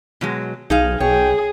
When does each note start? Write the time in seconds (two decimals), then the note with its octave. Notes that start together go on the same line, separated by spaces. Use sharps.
0.21 B2 F#3 G#3
0.70 B1 D#4 G#4 F5
1.00 B1 G#4 C#5 G5